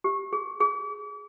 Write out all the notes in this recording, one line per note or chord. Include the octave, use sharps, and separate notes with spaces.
G4
G#4
G#4